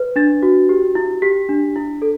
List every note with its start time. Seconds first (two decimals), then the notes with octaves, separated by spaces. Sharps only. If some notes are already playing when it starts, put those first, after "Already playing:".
Already playing: B4
0.16 D4 A6
0.43 F#4
0.69 G4
0.95 E4
1.22 G4 B6
1.49 D4
1.76 E4
2.02 A4